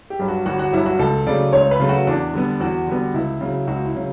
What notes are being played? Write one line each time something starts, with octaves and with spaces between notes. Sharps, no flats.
G4
G2 F#3
F#4
G1 F#4
F#4
G2 F#3 E4
F#4
C#2 A4
C#3 F#3 A3 D5
C#2 C#5
B4
C#3 F#3 A3
F#4
E2 D4
D3 G3 B3
E2 F#4
D3 G3 B3
C#2 E4
C#3 F#3
C#2 F#4
E4
C#3 F#3